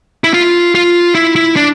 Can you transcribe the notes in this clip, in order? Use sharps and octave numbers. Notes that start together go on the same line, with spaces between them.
E4
F4
F4
E4
E4
D4